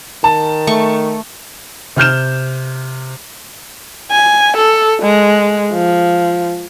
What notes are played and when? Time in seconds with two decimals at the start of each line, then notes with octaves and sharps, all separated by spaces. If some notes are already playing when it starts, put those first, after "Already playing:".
0.24 D#3 A5
0.67 A3 C#6
1.96 C3 F6 G6 E7
4.11 G#5
4.57 A4
5.03 G#3
5.73 F3